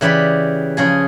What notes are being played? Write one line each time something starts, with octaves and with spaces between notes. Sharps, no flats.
C#3 E3 G4 D5 B5
C#3 F3 G#4